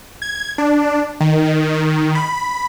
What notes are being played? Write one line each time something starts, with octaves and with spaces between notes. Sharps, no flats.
G#6
D4
D#3
D#3
B5